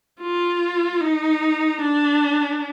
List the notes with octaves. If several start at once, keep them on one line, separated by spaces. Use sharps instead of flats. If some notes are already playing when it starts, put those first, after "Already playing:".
F4
D#4
D4